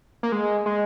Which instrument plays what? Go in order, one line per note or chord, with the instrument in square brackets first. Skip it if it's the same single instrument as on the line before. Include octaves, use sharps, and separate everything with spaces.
[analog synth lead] A#3
G#3
G#3